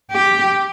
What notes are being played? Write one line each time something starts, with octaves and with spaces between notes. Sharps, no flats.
G4